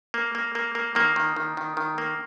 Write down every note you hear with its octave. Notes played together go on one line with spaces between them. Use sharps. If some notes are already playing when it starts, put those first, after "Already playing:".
A#3
A#3
A#3
A#3
D#3 A#3
D#3
D#3
D#3
D#3
A#3